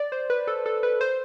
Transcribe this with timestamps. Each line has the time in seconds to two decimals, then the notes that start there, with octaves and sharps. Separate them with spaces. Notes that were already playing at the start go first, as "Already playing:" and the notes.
Already playing: D5
0.12 C5
0.30 B4
0.47 A4
0.66 A4
0.83 B4
1.01 C5